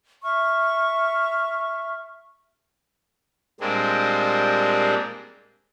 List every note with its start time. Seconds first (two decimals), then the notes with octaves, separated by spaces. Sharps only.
0.24 E5 C#6 F6
3.60 A#2 G3 G#3 A#3 C4 D4